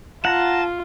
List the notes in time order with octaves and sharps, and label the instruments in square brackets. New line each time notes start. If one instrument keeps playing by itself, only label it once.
[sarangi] F4 [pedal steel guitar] F#5 A#5 [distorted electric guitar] A5